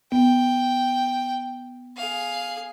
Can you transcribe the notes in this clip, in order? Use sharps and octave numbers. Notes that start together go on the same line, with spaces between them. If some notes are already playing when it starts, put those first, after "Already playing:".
B3 G5
G#4 F5